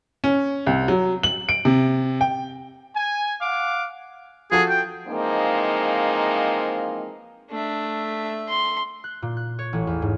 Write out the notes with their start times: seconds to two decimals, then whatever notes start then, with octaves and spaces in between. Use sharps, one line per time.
0.24 C#4
0.66 C2
0.88 F#3
1.23 F#7
1.49 D7
1.65 C3
2.21 G5
2.95 G#5
3.41 F5 F#5 D6
4.51 F3 F#4 G#4 A4
4.69 G5
5.08 E3 F3 G#3 A#3 C4 D#4
7.51 A3 D4 E5
8.49 C6
9.04 F#6
9.22 A#2
9.37 F#6
9.59 C#5
9.73 A1
9.87 E2
10.02 G#2